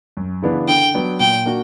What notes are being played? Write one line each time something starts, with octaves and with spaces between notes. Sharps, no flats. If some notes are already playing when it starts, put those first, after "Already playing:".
F#2
C#3 E3 B3 D4
D3 G5
F#3 B3 D4
A#2 G5
A#3 D4 F#4